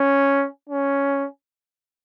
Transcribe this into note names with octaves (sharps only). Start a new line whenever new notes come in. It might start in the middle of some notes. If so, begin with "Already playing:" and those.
Already playing: C#4
C#4